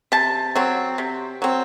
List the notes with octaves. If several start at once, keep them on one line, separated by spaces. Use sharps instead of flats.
C3 A5
F#3 C4
C3
F#3 C4